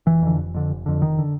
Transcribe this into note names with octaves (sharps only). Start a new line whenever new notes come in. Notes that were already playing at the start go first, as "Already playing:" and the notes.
F1 E3
F2 D3
F1
F2 D3
F1
F2 D3
F1 D#3
D3